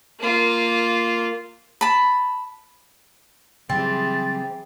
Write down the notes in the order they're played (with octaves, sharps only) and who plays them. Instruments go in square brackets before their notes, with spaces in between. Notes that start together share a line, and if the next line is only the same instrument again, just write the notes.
[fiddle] A#3 F4
[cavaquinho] A5 B5
[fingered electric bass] C#3 F#3 G3 [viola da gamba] E3 G4 G#4 [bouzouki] C4 [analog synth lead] A6